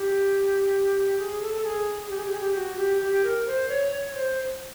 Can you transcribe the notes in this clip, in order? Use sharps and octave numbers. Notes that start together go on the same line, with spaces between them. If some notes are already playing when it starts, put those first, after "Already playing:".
Already playing: G4
G#4
A4
A4
G#4
G4
G#4
G4
G#4
G4
F#4
G4
G4
A#4
C5
C#5
C#5
C5